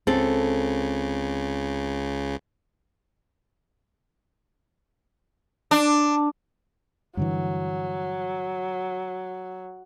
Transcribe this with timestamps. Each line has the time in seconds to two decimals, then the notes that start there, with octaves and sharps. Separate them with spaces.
0.07 C#2 C#3 C4 A4
5.71 D4
7.17 G2 D3 E3 F#3